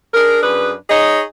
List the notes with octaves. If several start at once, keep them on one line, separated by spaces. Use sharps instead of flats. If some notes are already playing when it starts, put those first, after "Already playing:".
D4 G#4 A#4
F#2 D4 G#4 B4
D#4 G#4 C#5 D#5